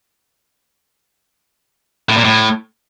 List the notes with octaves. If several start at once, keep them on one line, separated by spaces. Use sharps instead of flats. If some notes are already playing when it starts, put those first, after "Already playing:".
A2
A#2
A2